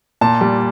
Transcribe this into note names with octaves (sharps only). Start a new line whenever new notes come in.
A#2 A5
G3